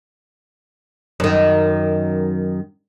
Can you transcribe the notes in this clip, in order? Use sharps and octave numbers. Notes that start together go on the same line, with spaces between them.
F#2 D#3